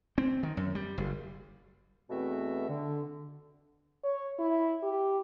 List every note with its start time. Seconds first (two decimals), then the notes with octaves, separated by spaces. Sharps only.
0.18 C4
0.43 D#3
0.57 F#2
0.75 G3
0.98 F#1
2.10 E2 B2 A3 C4 F#4 E5
2.69 D3
4.04 C#5
4.39 E4
4.83 G4